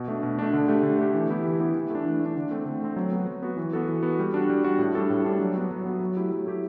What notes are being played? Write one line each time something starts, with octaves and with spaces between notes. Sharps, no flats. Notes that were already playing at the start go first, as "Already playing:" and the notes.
Already playing: B2
A3 D4
B2
A3 D4
D3
A3 D4 G4
D3
A3 D4 G4
E3
B3 E4 G4
E3
B3 E4 G4
E3
A3 D4
E3
A3
D4
D3
A3 C4
D3
A3 C4
F#3
B3 F#4
F#3
B3 F#4
E3
B3 F#4 A4
E3
B3 F#4 A4
G3
D4 F#4
G3
D4 F#4
A2
G3 D4 A4
A2
G3 D4 A4
F#3
B3 F#4
F#3
B3 F#4
F#3
A3 E4 G4
F#3
A3 E4 G4